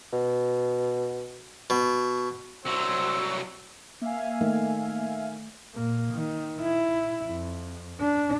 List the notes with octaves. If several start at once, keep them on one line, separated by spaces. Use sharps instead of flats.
B2
B2
C2 F#3 C5 E6
A#3 E5 F5 G#5
D#3 A3
A#2 A#3
D#3
E4
F2
D4